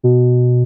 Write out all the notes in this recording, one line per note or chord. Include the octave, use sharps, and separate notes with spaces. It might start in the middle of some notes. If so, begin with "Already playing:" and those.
B2